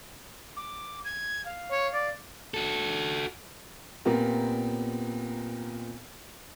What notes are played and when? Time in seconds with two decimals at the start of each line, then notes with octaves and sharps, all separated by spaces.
0.57 D6
1.05 G#6
1.45 F5
1.71 C#5
1.93 D5
2.54 F#4 A4
4.05 A#2 B3 C4 G4 A#4